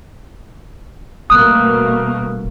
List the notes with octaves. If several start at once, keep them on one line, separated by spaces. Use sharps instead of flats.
D#1 B2 A3 A#3 D#6 F#6